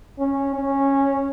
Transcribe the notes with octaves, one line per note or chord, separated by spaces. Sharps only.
C#4
C#4